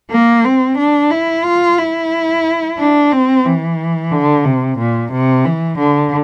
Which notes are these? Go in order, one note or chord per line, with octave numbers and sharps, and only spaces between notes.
A#3
C4
D4
E4
F4
E4
D4
C4
E3
D3
C3
A#2
C3
E3
D3